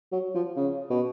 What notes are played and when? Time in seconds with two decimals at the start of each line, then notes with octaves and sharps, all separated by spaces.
0.12 F#3
0.34 F3
0.56 C#3
0.90 B2